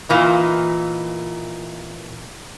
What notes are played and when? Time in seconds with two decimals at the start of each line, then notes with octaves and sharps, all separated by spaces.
0.09 A#2 E3 D#4